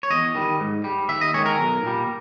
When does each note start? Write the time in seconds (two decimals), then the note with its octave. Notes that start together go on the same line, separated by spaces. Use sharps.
0.03 C#5
0.10 E2 D#5
0.35 D#3 G3
0.60 G#2
0.84 G3
1.09 D#2 E5
1.21 D#5
1.34 D#3 G#3 C#5
1.46 A#4
1.58 B1
1.83 A#2 G3